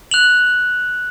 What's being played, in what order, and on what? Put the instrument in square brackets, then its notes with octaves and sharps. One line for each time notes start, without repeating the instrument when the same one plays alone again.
[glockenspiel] F#6 F7 F#7